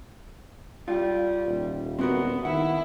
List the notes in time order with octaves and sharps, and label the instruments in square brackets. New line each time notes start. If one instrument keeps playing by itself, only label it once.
[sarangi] G3 [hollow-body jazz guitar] F4
[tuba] D#1
[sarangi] B3 [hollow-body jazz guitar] C4 F#4 A#4
[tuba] D#3 [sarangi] E4 [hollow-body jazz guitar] F#5